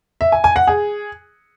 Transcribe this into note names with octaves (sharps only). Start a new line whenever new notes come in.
E5
G#5
G#5
F#5
G#4